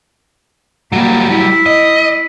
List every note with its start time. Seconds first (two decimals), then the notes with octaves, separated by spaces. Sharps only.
0.93 F#3 G3 A#3
1.33 E4
1.66 D#5